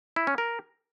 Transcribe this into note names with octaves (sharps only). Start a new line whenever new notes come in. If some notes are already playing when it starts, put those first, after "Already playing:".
E4
C#4
A#4